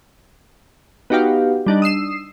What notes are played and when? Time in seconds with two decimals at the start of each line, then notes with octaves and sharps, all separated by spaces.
1.10 B3 D#4 F#4 G4 F5 G5
1.66 G3 D4 D#4
1.82 D#6 E6 C7 E7